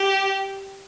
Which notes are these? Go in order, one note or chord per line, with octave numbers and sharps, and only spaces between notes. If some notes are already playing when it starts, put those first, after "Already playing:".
Already playing: G4